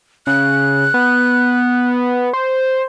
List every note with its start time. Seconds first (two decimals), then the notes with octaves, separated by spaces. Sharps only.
0.27 C#3 F#6
0.94 B3
2.33 C5